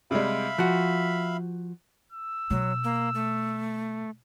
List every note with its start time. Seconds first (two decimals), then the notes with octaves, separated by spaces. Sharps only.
0.11 C3 G3 G#3 E5 F5 B5
0.58 F3 F#4 F#6
2.12 E6
2.50 B2 F#3
2.84 A#3
3.14 A3